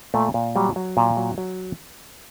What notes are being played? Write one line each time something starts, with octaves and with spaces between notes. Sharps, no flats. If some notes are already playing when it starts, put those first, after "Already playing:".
A#2 A3
A#2
F#3 G3
F#3
A#2
F#3
F#3